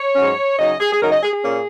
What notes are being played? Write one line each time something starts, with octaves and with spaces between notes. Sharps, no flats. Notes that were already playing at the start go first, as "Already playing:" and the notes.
Already playing: C#5
G#2 F#3 C#4
C#3 F#3 D#4 D#5
G#4
G#4
C#3 F#3 D#4 A#4
D#5
G#4
G#4
A#2 A#3 C#4